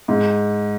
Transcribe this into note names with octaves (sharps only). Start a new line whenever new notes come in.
G#2